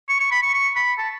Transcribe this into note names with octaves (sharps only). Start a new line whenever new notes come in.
C#6
C#6
B5
C#6
C#6
B5
A5